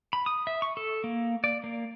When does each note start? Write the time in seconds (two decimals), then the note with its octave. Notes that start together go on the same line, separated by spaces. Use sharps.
0.13 B5
0.26 D#6
0.47 E5
0.62 C#6
0.77 A4
1.04 A#3
1.44 D5
1.64 A#3